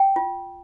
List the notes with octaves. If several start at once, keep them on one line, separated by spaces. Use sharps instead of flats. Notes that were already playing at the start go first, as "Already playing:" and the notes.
Already playing: G5
F4